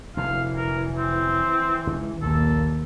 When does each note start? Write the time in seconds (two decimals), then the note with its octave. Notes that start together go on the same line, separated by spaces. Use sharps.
0.17 F1 F#2 D3 E3 F5
0.56 A#4
0.98 C4
1.87 C#2 G#3
2.22 A#1 D#2 A#2 A#3 A4